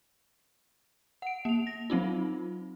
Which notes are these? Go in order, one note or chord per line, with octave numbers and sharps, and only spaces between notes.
F#5 D7
A#3 F7
A#6
F#3 C4 D#4 F4